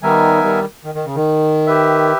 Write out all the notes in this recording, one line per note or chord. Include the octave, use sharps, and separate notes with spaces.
D#3 G3 B3 D#4 A#4 E5 G#5
D#3 G3
D#3
D#3
C#3
D#3
G4 B4 E5